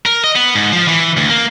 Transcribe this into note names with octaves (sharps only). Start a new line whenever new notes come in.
A#4
D#5
B3
G#2
F3
E3
D2
A#3